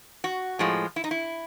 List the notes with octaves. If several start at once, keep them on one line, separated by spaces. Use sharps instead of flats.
F#4
A2 F3 G#3
E4
D#4
E4